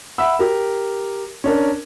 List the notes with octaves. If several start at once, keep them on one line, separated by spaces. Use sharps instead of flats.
E5 F#5 B5 E6
G4 A#4
C#4 D4 A#4